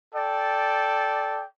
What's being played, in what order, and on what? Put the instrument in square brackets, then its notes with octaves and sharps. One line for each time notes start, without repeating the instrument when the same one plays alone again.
[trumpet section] A4 D5 G5